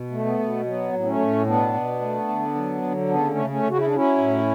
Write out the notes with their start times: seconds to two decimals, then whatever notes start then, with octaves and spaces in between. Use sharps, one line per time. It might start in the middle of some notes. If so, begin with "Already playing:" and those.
Already playing: B2
0.11 A3
0.25 B3
0.39 B2
0.65 F#3 B3
0.92 A2
0.99 B3
1.06 A3 C#4
1.19 A2
1.46 B2 B3 D4
1.74 B2
2.01 A3
2.28 D3
2.55 F#3
2.82 D3
3.09 C#3 B3 D4
3.29 A3 C#4
3.36 C#3
3.50 A3 C#4
3.63 C#3
3.69 F#4
3.78 E4
3.86 D4
3.91 F#3 C#4 E4
4.18 A2